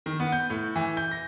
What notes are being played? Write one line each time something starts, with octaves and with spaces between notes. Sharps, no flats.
D#3
B3
G6
A2
E3
G6
A#6